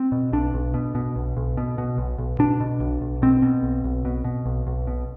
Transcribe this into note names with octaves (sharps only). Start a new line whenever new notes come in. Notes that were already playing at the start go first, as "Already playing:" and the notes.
Already playing: C4
B2
B1 D4
B1
B2
B2
B1
B1
B2
B2
B1
B1
B2 D4
B2
B1
B1
B2 C4
B2
B1
B1
B2
B2
B1
B1
B2